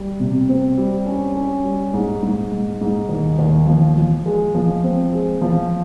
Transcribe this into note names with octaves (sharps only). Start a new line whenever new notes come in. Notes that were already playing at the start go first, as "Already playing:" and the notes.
Already playing: G3
C3
C4
G3
C#4
C#4
G3
G#2
G#2
G#2
G#2
D#2
D#2
F3
F3
G#3
F3
C4
G#3
F3